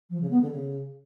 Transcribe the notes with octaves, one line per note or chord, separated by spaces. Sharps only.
F3
C#3
B3
D3
C#3